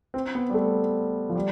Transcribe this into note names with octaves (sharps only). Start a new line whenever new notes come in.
C4
B3
G3
A3
F3
G3